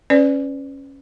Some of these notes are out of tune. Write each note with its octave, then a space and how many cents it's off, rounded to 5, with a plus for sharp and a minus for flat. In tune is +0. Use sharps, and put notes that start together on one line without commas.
C#4 -10 B4 +30 D5 +0